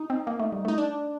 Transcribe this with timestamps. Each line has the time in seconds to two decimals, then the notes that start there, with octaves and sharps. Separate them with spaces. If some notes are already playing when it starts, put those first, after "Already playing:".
Already playing: D#4
0.10 C4
0.27 A#3
0.40 A3
0.52 G3
0.65 A3 D#4
0.78 D4